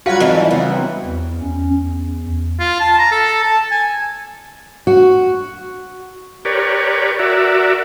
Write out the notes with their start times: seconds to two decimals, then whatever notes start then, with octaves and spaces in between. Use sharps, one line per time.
0.06 F#3 G3 F4 F#4 B4 G#6
0.20 F2 G#2 E3
0.51 C#3 B3
0.70 F#3 C4
1.04 E2
1.41 C#4
1.74 E2
2.60 F4
2.80 A5
2.99 A#5
3.12 A4
3.44 A5
3.72 G#5
4.87 F#4
6.45 G4 A#4 B4 C#5 D5
7.19 F#4 A#4 D5 E5